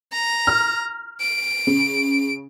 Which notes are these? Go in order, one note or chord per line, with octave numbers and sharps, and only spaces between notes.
A#5
F6
D7
C#3